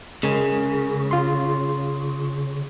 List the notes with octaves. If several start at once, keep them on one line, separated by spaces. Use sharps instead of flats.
C#3 G#3 A#4 G#5
F4 C6